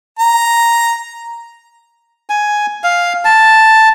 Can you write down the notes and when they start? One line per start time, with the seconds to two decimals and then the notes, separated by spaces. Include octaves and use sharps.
0.19 A#5
2.30 G#5
2.84 F5
3.25 A5